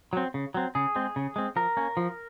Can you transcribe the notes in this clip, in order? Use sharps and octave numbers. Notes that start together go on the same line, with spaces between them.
F#3 C4
C#3
F#3 C4
C#3 G#4
G#3 C4
C#3
G#3 C4
F3 A#4
A#3 C#4
F3